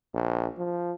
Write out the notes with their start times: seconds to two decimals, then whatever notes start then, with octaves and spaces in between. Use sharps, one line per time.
0.14 A#1
0.58 F3